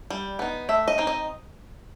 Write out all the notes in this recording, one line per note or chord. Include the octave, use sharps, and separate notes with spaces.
G3
B3 D#4
A3 E5
D#5
C4 D#4
D#5